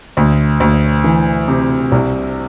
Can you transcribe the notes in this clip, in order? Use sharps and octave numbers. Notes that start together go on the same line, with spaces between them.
D2
D2
E3
C3
C2